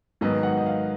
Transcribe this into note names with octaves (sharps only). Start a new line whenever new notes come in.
G#2 D#3 F#3 B3 D#5
F#5
D#5
F5